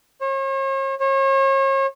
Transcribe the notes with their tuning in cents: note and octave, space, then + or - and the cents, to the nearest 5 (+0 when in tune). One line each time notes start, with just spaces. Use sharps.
C#5 -45
C#5 -40